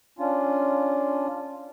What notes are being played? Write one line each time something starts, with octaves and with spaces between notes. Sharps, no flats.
C#4 D4 F4